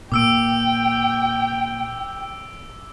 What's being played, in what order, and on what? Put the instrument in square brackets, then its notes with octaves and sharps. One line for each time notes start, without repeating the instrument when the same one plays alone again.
[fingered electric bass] A#2 [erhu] G5 [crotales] D6 E6 D7